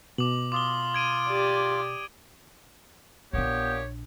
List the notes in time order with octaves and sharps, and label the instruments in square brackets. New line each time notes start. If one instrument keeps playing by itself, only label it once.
[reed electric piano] B2 [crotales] D6 F#7
[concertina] F4 [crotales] D6 D#6 G7
[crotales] G#6 D7 D#7
[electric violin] G4 D5
[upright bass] A#1 D4 [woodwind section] A#2 B3 G4 [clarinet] C#5